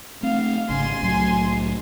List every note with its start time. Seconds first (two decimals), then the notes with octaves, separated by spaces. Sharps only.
0.23 A3 C4 F5
0.69 G#1 C#3 G#5 C6
1.02 C2 A2 F#3